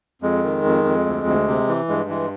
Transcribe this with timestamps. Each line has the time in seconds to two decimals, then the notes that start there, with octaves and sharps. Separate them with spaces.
0.22 F2 G#3
0.44 D#3
0.64 F2
0.84 F2
1.05 D2
1.26 D2
1.48 C3
1.68 E3
1.89 G2 G#3
2.09 E3 G#3